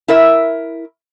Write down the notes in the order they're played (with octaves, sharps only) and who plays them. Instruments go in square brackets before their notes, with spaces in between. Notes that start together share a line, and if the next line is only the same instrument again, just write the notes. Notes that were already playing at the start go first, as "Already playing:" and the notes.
[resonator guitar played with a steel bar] E4 A#4 E5